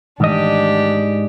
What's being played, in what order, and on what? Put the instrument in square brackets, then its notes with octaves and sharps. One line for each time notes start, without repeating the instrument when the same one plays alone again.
[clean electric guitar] G#2 D#5 [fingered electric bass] D#3 E3 A3 [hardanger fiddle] D4 G4